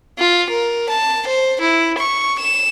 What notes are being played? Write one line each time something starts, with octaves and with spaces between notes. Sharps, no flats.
F4
A#4
A5
C5
E4
C#6
E7